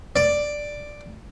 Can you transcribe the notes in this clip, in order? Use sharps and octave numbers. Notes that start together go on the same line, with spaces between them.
D5